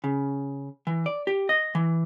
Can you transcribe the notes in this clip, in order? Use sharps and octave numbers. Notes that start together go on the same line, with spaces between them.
C#3
E3
D5
G4
D#5
E3